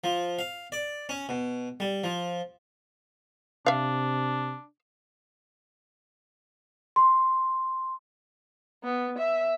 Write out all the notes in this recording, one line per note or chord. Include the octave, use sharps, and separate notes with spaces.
F3
F5
D5
C#4
B2
G3
F3
C3 D4 E5 F5
C6
B3
E5